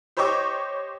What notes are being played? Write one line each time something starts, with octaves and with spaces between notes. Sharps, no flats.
G4 C5 C#5 D#5 C#6 D6